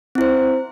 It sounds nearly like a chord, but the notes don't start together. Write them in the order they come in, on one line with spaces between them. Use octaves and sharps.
C4 E4 C5